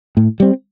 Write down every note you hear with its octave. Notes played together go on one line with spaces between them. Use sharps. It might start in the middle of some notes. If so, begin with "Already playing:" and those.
A2
G3 C4